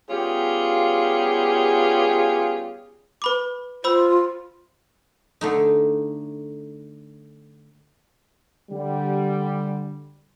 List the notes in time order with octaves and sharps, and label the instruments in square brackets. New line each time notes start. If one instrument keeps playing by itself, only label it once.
[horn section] G3 B3 C#4 F4 G4 G#4
[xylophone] B4 B5 D6
[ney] F4 [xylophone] C5 B5 E6
[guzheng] D3 A3 D#4
[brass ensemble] D3 G3